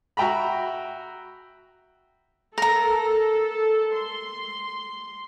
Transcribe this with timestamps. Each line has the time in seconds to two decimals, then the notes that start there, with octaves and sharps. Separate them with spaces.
0.17 F#4 E5 G5 A#5 B5
2.58 A4 A#4 A#5
3.95 C6